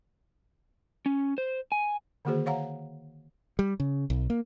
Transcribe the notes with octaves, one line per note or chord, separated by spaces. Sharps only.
C#4
C5
G#5
D3 D#3 A#3 F#4 G#4 C5
C#5 F5 F#5 A#5
G3
C#3
B1
A#3